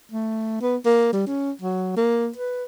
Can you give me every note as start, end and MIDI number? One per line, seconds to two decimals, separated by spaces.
0.12 0.59 57
0.61 0.76 59
0.85 1.12 58
1.13 1.26 55
1.27 1.51 61
1.61 1.94 54
1.97 2.29 58
2.36 2.64 71